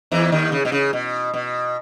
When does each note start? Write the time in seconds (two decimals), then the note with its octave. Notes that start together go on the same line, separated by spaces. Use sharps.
0.12 E2 E3
0.32 D#2 D#3
0.52 C#3
0.65 B2
0.72 C#3
0.93 B2
1.34 B2